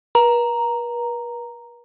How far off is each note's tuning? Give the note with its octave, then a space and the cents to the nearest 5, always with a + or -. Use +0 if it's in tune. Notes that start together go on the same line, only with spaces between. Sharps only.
B4 -45 A#5 +0